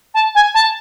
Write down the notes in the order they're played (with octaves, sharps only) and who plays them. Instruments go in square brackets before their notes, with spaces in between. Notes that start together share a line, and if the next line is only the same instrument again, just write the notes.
[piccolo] A5
G#5
A5